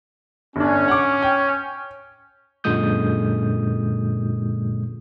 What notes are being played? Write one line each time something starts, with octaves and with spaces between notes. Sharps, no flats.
G1 C#4 D4
F#5 D6
G5
F#2 A#2 D3 G#3 D#6 G6